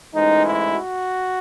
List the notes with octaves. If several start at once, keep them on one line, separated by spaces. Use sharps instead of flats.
A1 G#2 E3 G#3 D#4
E4
F#4